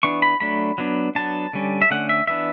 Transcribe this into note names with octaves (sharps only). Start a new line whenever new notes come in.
E3 B3 D4 C#6
B5
F#3 A3 D4 B5
F#3 B3 D4
F#3 B3 D4 A5
D3 G3 C#4
E5
D3 A3 C#4 F#5
E5
E3 B3 D4 E5